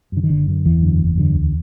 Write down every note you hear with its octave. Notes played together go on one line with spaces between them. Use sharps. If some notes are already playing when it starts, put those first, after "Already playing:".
F#2 D3
D#3
F#1 D3
F#2 D3
F#1 E2 E3
F#2 D3
F#1
F#2 D3
D2